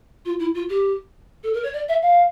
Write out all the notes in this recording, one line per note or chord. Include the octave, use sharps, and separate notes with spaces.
F4
E4
F4
G4
A4
A#4
C#5
D5
E5
F5